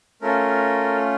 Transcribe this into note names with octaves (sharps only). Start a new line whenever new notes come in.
A3 C#4 F4 A4 A#4